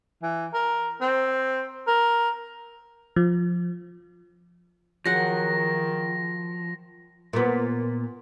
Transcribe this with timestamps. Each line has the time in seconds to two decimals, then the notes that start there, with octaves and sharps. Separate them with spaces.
0.22 E3
0.53 A#4
1.01 C4
1.87 A#4
3.16 F3
5.06 D#3 F3 F#3 G#4 F#5 A#6
7.33 A#2 B3